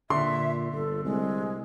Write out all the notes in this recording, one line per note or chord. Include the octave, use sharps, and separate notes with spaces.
A#2 D3 E5 C6
G1 A4
C2 G#3